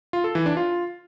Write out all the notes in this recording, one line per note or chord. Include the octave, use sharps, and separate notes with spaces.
F4
A4
E3
D4
F4